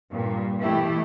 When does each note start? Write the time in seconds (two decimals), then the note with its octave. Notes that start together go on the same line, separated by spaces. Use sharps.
0.11 G2 A#2
0.60 B2 E3 A3 E4 G4